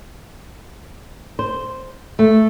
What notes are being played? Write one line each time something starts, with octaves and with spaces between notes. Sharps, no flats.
C5
A3